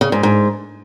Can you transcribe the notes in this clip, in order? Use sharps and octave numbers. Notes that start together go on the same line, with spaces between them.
C#3
G#2
G#2